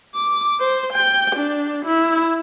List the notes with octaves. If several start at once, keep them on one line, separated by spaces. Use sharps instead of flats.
D6
C5
G5
D4
E4